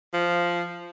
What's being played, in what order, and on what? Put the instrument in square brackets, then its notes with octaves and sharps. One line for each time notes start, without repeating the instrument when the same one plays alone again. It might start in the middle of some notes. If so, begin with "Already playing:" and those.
[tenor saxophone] F3